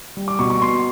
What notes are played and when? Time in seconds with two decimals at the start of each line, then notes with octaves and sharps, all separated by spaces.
0.17 G3
0.28 D6
0.39 B2 C#6
0.50 C#6
0.62 B2 C6